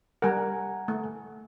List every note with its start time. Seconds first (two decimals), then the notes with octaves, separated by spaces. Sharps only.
0.22 G3 A#4 F#5 G#5 A#5
0.88 A3